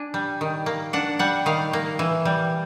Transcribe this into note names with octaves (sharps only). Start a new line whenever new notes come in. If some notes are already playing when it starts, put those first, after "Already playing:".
Already playing: D4 G#5
G3
D#3
A#3
D4 F#5
G3 F#5
D#3 F5
A#3
E3
G3